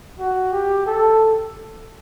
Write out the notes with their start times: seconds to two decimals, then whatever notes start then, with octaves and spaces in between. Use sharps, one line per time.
0.20 F#4
0.52 G4
0.86 A4